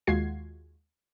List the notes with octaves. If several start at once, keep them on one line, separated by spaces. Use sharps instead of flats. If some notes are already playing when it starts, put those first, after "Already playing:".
D#2 G#3 F4 F#4 G#6 C7